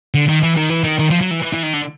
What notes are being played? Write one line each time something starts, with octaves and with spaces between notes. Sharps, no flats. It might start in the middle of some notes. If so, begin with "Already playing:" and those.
D3
D#3
E3
D#3
E3
D#3
D#3
F3
F#3
E3
E3
E3
D#3
D3